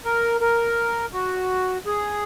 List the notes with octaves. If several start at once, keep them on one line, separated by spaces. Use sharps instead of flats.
A#4
A#4
F#4
G#4